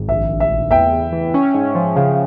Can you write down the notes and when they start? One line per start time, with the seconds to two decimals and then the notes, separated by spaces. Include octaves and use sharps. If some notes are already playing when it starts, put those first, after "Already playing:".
Already playing: G#1
0.08 A#1 E5
0.29 A#1
0.40 E5
0.50 A#1
0.71 E2 E5 G5
0.92 E2
1.13 E3
1.34 C#4
1.54 G#2
1.75 F3
1.96 C#3 F5